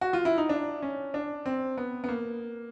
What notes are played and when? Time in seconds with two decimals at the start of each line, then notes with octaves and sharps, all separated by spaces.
0.01 F#4
0.13 F4
0.25 E4
0.38 D#4
0.49 D4
0.82 C#4
1.14 D4
1.46 C4
1.77 B3
2.04 B3
2.09 A#3